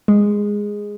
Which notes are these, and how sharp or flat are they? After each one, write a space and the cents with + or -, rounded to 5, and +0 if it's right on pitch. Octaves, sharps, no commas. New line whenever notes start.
G#3 -10